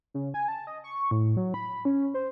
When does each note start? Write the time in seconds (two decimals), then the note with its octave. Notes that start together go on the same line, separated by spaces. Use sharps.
0.14 C#3
0.34 G#5
0.48 A5
0.67 D#5
0.84 C#6
1.11 A2
1.37 F#3
1.54 B5
1.85 C#4
2.14 C5